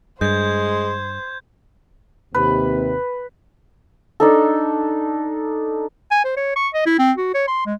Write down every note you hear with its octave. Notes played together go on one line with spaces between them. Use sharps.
G2 G#3 C5 G6 G#6
D#2 C3 B4
D4 D#4 A4
G#5
C5
C#5
C#6
D#5
E4
C4
F#4
C#5
C6
G#3